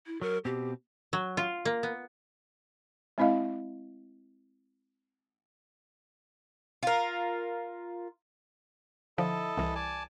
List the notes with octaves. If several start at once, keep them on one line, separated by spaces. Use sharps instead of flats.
E4
F#3 A#4
B2 C4 G4
F#3
F4
A#3
B3
G#3 C4 E4 D#5 F5
F4 A#4
D3 F3 E4 A4 D#5
C2 E3
D5 G#5 A5